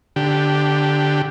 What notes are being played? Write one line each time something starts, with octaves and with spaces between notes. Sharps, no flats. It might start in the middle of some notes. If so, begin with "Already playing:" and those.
D3 G4